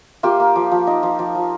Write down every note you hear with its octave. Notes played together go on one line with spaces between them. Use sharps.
A#3 F4 G4
A#3
F3
F3
D#4
F3
F3
F3